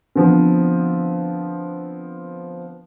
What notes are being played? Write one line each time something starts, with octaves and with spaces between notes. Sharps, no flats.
D3 F3 B3 C4